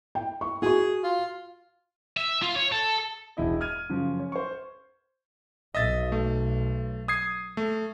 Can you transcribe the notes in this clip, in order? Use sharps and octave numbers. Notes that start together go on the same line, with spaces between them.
G5
C#6
F#4 G#4 C#6
F4
E5
F4
C#5
A4
E1 E4 D#5
F6 G#6 D#7
F#2 C#3 F3
C#4
C5 C#6
B1 D#5 E5 A6
A3
D#6 G#6 C7
A3